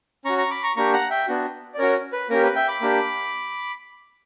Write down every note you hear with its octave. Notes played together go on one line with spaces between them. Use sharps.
C#4 F#4 A#5 C#6
A#5 C#6
B5 D6
A#5 C#6
A#3 D4 G4 A#5 C#6
F#5 A#5
E5 G5
B3 D4 F#4
D5
C#4 F#4 A#4 C#5
B4
A#3 C#4 G4 A#4
B4
E5 G5
B5 D6
A#3 D4 G4